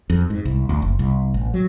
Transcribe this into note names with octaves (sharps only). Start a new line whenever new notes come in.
F2
G#2
C2
D2
F#1
C2
A1
F#3